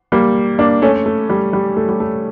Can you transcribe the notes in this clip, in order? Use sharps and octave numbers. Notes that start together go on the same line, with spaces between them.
G3 A#3
A#3 D4
A3 C#4
A3
G3
G3
A3
G3
A3